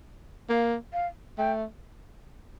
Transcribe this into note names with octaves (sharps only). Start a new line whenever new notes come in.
A#3 F5
F5
A3 G5